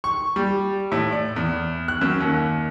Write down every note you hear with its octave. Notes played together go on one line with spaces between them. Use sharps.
C#6
G3
A2
D5
E2
F#6
F#2
D#2